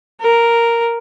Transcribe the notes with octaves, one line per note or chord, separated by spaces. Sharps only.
A#4